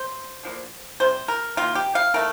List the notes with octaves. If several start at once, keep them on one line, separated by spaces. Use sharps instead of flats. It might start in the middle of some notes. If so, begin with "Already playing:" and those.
Already playing: C5
D3 F3 A#3
C3 G3 C5
A#4
D#3 A#3 F4
G4
F5
D#3 A3 A#4